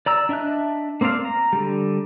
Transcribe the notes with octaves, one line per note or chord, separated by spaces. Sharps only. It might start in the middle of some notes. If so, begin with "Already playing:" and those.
D5 A#5 E6
D4 D#5 E5 A5 F#6
A#3 C4 C5 D5 F5
A#5
D3 G3